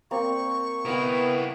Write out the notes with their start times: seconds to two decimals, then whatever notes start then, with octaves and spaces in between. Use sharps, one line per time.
0.11 A#3 C4 D5 C#6
0.85 B3 E4 A#4 D#5 G5